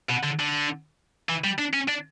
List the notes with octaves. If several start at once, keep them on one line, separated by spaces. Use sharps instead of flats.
B2
D3
D3
E3
G3
D4
C#4
D4